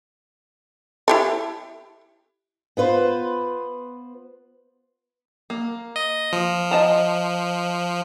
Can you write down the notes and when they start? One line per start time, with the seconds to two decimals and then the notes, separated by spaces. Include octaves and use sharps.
1.08 E4 G4 A4
2.77 B3 F4 B4 C5
5.50 A#3
5.96 D#5
6.33 F3
6.71 D#5 A5 A#5